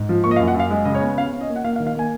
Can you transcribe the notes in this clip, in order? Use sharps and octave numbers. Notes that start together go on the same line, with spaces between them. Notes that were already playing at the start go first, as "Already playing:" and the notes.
Already playing: G#2
F3
A#3 C#6
D#5
F5
F#2
F#5
F#2
F5
G#3 D#5
C#3 D#5
C#5
B3
C#4 F5
C#4
D#5
A#3
F#5
A#3 F5
F5
D#3
F5
A#3 G#5